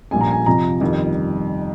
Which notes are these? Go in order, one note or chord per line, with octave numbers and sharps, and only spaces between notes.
A#1 A#2 G3 G#5
A#5
G#5
F2 C3 F3 A#5
G1 F2 D#3 G3